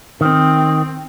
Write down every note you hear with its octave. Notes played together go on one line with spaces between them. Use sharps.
D#3 C4